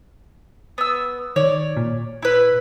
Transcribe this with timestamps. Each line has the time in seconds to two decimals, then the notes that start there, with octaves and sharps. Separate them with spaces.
0.78 B3 E6
1.36 D#3 C#5 D5
1.77 A#2
2.22 E4 B4